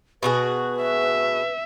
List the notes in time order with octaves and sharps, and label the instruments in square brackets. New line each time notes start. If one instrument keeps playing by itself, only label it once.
[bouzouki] B2 F#4 G#4 [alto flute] B4
[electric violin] E5